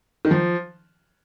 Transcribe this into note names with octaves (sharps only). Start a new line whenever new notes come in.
D#3
F3